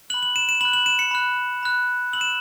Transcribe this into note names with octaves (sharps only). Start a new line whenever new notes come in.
B5 F#6 F#7
F#7
E7
E7
B5 F#6 F#7
F#7
E7
C#7
B5 F#6
B5 F#6
B5 E6 F#7
E7